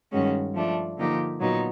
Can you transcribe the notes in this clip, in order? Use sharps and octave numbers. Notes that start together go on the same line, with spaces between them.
G2 D#3 G#3 C#4 F#4
F3 A3 D4
D3 F3 A#3 D#4 G4
A#2 F#3 B3 D#4